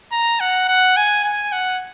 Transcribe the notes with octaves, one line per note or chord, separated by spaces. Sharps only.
A#5
F#5
F#5
G#5
G#5
F#5